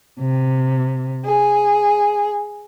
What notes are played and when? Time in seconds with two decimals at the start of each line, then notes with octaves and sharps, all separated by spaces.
0.19 C3
1.24 G#4